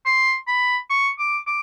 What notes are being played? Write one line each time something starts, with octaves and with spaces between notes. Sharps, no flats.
C6
B5
C#6
D6
D6